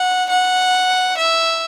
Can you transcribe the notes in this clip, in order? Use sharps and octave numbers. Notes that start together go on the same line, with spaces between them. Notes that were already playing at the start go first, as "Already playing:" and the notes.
Already playing: F#5
F#5
E5